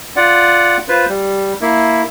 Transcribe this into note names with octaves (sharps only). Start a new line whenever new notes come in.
F4 D5 F#5
F4 B4 C5
G3
A#3 E4